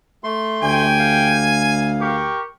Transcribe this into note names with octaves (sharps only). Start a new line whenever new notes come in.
A3 C6
D2 G4 G5 G#5
F5
G4 A#4 C#6